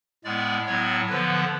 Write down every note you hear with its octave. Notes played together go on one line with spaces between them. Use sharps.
A2 G#3 B3 D5
A2 F#3 B3 C#5
D3 F3 B3 B4